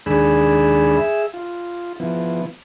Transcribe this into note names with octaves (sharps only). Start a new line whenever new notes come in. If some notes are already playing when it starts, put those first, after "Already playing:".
D#2 G#3 D4 G#4 B5 E6
G#4 E5 E6
F4
F3 B3 E4